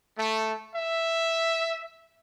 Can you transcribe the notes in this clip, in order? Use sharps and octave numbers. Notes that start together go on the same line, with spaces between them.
A3
E5